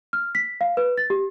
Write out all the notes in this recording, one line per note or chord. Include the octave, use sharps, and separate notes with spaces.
F6
B6
F5
B4
A6
G4